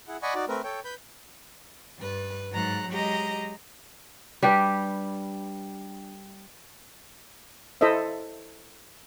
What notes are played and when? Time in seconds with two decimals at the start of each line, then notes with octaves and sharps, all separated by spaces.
0.08 E4 G#4 F#5
0.22 D5 D#5 F#5 G#5 B5 C#6
0.35 D#4 F#4 D5
0.48 A3 C4 A#4 B4
0.64 A4 C#5 G5
0.84 B4 B5 G6
1.98 G2 B4
2.51 G#2 F#3 A#5 F#6
2.90 F#3 G#3 G4 D#5 A#5
4.42 G3 D4 G4 B4
7.81 E4 A4 C5 D#5 E5